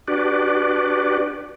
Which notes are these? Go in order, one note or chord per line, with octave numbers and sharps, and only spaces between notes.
D4 F#4 G4 B4 D5